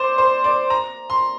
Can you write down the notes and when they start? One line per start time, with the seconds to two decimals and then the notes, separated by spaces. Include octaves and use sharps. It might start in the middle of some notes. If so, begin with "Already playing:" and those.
Already playing: C5 D5
0.18 C5
0.44 D5
0.70 A#5
1.10 C6